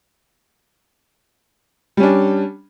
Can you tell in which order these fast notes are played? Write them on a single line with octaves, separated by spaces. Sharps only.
G3 C#4 D4